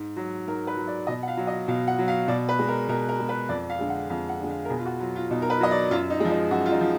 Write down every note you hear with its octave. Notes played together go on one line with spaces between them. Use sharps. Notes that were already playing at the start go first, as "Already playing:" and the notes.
Already playing: G#2
F#3
G#2 A#4
B4
F#3
D5
B2 D#5
F#5
F5
F#3
D#5
B2 F5
F#5
F#3
F5
B2 D5
B4
G#3
A#4
B2 A#4
A#4
G#3
B4
F2 D5
F5
D3 G#3
F#5
F2 F5
F#5
D3 G#3
F5
A#4
B2 G#4
F4
F#4
F#3 F4
F4
B2 D#4
A#4
B4
F#3 D#5
D5
F#2 F4
D#4
F3 G#3
D#4
F#2 F#4
F4
D#4
F3